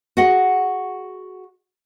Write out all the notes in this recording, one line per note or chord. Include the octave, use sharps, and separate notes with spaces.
F#4 G#4 D#5 F#5